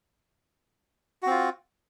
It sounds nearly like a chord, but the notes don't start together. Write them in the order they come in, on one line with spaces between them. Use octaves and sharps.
F#4 C4 F4